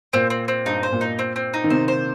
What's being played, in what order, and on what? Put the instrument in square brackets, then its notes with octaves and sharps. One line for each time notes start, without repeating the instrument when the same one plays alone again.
[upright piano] A#2 [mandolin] C4
[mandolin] C4
C4
[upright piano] G2 [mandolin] D#4
[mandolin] C5
[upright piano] A#2
[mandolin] D#4
C4
C4
D#4
[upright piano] D#3
[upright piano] C3 [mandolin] C5
[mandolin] C5